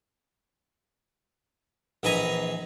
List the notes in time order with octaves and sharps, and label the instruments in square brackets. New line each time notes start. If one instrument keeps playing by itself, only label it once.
[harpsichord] A#1 E3 B4 D#5 G#5 A#5